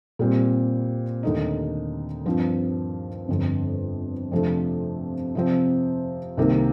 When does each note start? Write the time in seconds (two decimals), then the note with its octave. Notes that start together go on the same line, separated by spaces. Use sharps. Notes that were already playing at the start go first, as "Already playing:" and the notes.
0.19 A#2 G3 C4
1.23 D#2 D3 A3 D#4
2.26 G2 F3 C4 F4
3.28 G1 F2 D3
4.32 F2 C3 F3 A3 D4
5.35 C3 F3 C4
6.37 C2 C3 D#3 A#3